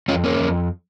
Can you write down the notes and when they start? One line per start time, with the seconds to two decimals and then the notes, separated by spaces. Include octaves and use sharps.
0.08 F2 C#4 F4
0.24 A#3 C#4
0.40 F2